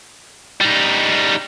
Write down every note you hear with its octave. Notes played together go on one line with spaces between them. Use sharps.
G3 D#4